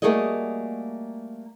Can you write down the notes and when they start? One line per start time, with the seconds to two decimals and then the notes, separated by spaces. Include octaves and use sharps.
0.02 G3 A3 A#3 F#4 G#4 D#5